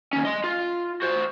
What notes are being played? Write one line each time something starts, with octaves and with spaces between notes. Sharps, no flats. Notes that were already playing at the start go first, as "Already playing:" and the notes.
D#2 C#4
D#5 C6
F4
F#4 C5